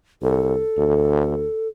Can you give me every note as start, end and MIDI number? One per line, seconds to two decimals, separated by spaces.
0.22 0.61 36
0.22 1.68 69
0.77 1.46 38